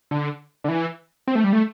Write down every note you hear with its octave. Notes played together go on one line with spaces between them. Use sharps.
D3
D3
E3
C4
A3
G3
A3